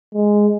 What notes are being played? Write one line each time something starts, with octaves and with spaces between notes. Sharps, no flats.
G#3